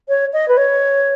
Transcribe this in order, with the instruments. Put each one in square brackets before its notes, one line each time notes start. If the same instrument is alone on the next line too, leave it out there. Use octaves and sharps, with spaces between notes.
[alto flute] C#5
D#5
B4
C#5